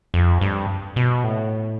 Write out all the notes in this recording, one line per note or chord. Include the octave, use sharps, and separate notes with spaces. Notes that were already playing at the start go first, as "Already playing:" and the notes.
F2
G2
B2
A2